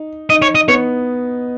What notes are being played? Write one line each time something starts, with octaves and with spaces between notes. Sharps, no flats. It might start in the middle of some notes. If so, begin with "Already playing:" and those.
Already playing: D#4
D#4 D#5
C#5
D#5
B3 C#5